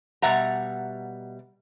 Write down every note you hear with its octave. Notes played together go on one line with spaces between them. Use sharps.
B2 G3 E5 F#5 A#5